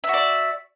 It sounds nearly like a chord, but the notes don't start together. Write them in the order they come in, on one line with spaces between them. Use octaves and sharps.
E5 F#4 D5